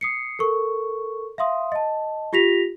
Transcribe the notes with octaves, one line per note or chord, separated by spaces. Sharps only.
D#6 C7 C#7
A4 A#4 C#6
E5 F5 C6 D#6
D#5 A5
F4 G4 A#6 B6 F7